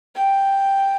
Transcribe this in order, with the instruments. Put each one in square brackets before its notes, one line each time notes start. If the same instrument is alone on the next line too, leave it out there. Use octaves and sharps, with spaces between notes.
[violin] G5